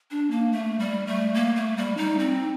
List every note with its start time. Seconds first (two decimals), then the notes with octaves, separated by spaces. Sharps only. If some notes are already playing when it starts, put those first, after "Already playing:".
0.11 D4
0.31 A#3
0.52 A3
0.79 G3
1.07 A3
1.34 A#3
1.56 A3
1.77 G3
1.97 D#4
2.19 C4